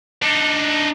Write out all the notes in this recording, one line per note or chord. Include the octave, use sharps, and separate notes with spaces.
D4 D#4